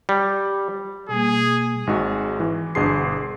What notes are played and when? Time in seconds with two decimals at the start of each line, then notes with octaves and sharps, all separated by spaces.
0.09 G3
1.09 B2 G3 A#3 G#4
1.87 G#1 G#3 D#4 F#4
2.40 E3
2.75 G1 B2 D4 G#4 C6 C7